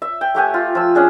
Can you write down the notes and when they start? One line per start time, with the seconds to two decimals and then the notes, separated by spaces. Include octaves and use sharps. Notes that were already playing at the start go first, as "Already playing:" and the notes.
0.02 E5
0.21 G5
0.35 A3 G4 F#5 G#5
0.54 F4
0.75 F3 E6
0.95 C#4 D4 G#4